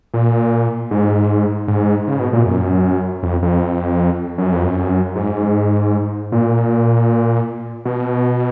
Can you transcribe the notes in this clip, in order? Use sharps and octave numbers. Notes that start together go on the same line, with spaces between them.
A#2
G#2
G#2
C#3
B2
A#2
F#2
F2
F2
F#2
F2
F#2
G#2
A#2
B2